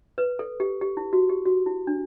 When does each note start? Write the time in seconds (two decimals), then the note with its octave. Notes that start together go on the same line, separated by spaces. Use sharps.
0.18 B4
0.39 A4
0.60 G4
0.81 G4
0.97 E4
1.13 F#4
1.29 G4
1.46 F#4
1.66 E4
1.87 D4